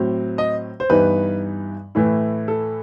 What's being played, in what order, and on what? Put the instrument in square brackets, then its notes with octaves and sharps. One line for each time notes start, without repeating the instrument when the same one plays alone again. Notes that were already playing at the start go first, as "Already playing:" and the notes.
Already playing: [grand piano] A2 F#3 C4
D#5
C5
G2 E3 G3 B3 D#4 B4
A2 E3 A3 E4
A4